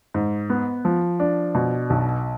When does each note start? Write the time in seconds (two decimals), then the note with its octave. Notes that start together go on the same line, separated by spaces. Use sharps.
0.14 G#2
0.50 B3
0.85 F3
1.20 D4
1.55 B2
1.90 B1